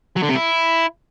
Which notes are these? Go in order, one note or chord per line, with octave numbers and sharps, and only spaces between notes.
F#3
D3
C3
E4